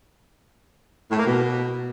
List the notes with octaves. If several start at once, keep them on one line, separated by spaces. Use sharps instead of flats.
A2
A#3
B2